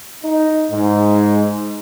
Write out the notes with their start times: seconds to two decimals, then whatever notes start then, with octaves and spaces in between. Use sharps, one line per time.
0.23 D#4
0.70 G#2